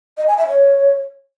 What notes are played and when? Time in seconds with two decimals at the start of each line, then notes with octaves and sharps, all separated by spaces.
0.18 D#5
0.28 G#5
0.38 E5
0.48 C#5